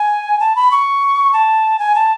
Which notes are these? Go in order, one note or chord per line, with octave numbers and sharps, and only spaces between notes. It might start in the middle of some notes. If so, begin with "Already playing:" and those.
Already playing: G#5
A5
B5
C#6
A5
G#5
A5